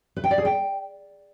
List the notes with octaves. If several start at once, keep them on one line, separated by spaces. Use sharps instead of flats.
B4
G5
D5
G#4
G5